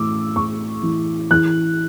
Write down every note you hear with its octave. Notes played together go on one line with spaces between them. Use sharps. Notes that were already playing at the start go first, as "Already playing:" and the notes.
Already playing: A2 E3 D6 E6
A2 C#6
E3
E3 F#6